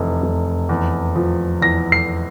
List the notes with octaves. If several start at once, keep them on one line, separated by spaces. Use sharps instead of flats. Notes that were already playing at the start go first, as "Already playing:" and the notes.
Already playing: F1 E2 E3
F1
E2
F3
E2 A#6
C7